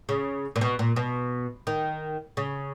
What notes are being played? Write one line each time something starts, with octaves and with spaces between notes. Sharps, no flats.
C#3
A#2
B2
A#2
B2
D#3
C#3